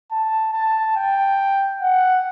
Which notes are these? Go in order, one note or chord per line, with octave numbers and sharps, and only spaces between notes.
A5
A5
G5
F#5